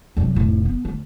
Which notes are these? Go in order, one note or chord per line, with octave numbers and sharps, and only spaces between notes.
C2 F#2
F1 A2
B3
D2